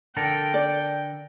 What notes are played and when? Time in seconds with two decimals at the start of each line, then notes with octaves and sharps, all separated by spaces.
0.17 D3 A4 A#4 G5
0.54 D5